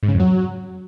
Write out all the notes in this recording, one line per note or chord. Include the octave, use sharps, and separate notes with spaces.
G#2
C#3
F2
F#3